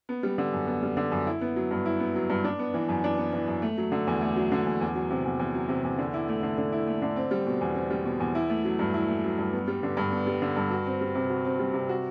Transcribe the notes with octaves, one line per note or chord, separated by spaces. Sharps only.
B3
G3
D3
F#2
B3
G3
D3
F#2
E4
B3
F#3
G2
E4
B3
F#3
G2
D4
B3
E3
F#2
D4
B3
E3
F#2
A3
F#3
D3
E2
A3
F#3
D3
E2
E2
F#3
C3
E2
E2
F#3
C3
E2
D3
E4
A3
D3
D3
E4
A3
D3
C4
G3
B2
E2
C4
G3
B2
E2
E4
A3
F#3
G2
E4
A3
F#3
G2
B3
G3
D3
G2
B3
G3
D3
G2
F#4
C4
G3
C3
F#4
C4
G3
C3
F#4